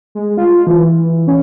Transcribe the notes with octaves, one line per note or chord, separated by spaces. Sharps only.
G#3
F4
E3
C#4